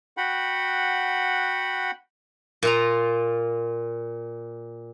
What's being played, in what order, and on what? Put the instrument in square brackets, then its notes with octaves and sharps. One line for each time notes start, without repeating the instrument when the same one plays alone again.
[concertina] F#4 F#5 G5 B5
[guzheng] A#2 F4 A#5